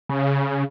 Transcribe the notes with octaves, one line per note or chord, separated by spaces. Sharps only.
C#3